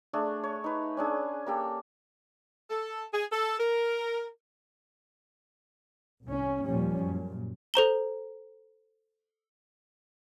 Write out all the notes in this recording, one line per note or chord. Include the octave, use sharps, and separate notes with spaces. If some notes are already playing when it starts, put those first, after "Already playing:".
A3 D4 G#4
C#5
D#4 B4
C#4 D4 G#4
A#3 G4 A4
A4
G#4
A4
A#4
C2 C#4
D#2 A#2 F3 G3 C#4
F#2 A#2
A4 C5 A#5 G7